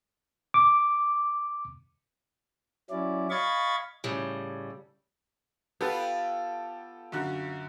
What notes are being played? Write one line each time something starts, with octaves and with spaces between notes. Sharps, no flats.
D6
F#3 C#4 E4 D5
D#5 F5 B5 C#6 G#6 A6
A2 C#3 G3
B3 F4 G4 A4 G5
F#2 D3 F#4